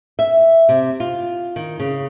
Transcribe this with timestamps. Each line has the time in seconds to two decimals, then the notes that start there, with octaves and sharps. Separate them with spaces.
0.19 E5
0.69 C3
1.00 F4
1.56 D#3
1.80 C#3